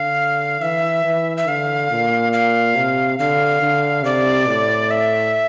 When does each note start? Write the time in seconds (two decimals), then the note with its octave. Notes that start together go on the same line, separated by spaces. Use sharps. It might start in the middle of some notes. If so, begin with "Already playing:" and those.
Already playing: D3 F5
0.61 E3 E5
1.05 E3
1.37 E5
1.47 D3 F5
1.91 A#2
2.33 F5
2.76 C3
3.19 D3 F5
3.62 D3
4.04 C3 D5
4.48 A2
4.91 E5